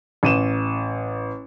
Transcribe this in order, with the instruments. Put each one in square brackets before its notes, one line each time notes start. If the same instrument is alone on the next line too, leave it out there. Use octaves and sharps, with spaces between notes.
[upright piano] A1 D#7 E7